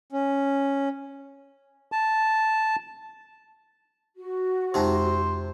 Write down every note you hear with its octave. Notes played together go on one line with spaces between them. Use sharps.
C#4
A5
F#4
F2 C3 G#3 C4 D#4 C5